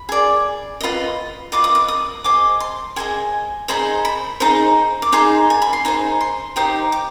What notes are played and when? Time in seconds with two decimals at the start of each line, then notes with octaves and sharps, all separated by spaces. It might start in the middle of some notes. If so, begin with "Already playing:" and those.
Already playing: B5
0.09 G#4 D5
0.81 F4 B4 D#5
1.52 F4 B4 D#5 D6
1.64 D#6
1.75 D6
1.88 D#6
2.24 G#4 C5 D#5 D6
2.60 C6
2.96 G#4 C5 D#5 G#5
3.68 D#4 G#4 C5 D#5 B5
4.05 B5
4.40 D#4 G#4 C5 D#5
5.02 D6
5.12 D#4 G#4 C5 C6
5.50 G#5
5.62 B5
5.73 C6
5.85 D#4 G#4 C5
6.21 C6
6.56 D#4 G4 C5 D#6
6.92 D6